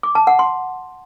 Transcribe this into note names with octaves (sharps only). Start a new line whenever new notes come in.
D6
A5
F#5
C6